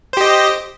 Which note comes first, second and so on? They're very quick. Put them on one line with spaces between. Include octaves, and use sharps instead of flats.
C5 G4 D#5